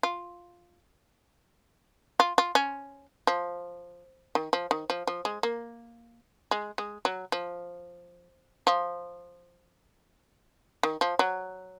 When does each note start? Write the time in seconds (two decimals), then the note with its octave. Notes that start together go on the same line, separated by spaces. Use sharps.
0.03 F4
2.20 F4
2.38 F4
2.55 C#4
3.27 F3
4.35 D#3
4.53 F3
4.71 D#3
4.90 F3
5.07 F3
5.25 G#3
5.43 A#3
6.51 G#3
6.78 G#3
7.05 F#3
7.32 F3
8.67 F3
10.83 D#3
11.01 F3
11.19 F#3